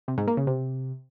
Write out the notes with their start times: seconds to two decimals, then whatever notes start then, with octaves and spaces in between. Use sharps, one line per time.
0.08 C3
0.18 G#2
0.27 A#3
0.37 C#3
0.47 C3